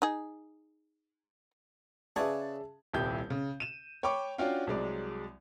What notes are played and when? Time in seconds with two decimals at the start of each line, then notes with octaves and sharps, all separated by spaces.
0.02 D#4 G#4
2.16 C#3 G#4 B4 C#5 D5 E5 F#5 A5
2.93 D#1 C2 E4 G4 G6
3.30 C#3
3.60 D#7 E7
4.03 C#5 G5 B5 C#6 D6
4.38 C#4 D4 F4 F#4 F5 G5
4.67 C2 F#3 G#3 D5